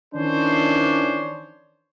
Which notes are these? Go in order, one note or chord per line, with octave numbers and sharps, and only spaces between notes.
D#3 E3 C#4 D4 C5 C#5